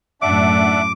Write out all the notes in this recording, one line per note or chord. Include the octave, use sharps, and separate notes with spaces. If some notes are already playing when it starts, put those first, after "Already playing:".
F#2 A2 D4 E5 F#5 D6